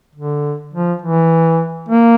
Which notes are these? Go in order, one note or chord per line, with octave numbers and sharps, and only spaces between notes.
D3
F3
E3
A#3